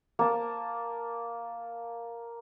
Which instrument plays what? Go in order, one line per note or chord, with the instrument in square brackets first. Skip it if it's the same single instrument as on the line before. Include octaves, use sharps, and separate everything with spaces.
[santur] A#3 A5